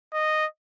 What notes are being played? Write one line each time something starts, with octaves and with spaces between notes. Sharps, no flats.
D#5